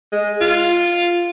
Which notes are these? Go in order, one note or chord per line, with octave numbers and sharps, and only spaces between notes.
G#3
F4